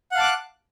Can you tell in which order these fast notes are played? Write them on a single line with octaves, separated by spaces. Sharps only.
F#5 F5 A5 D6 F#6